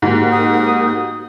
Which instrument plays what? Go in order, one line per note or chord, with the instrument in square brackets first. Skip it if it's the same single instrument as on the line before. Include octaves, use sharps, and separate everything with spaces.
[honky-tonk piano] G#2 [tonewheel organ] A#3 F#4 G4
[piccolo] D#6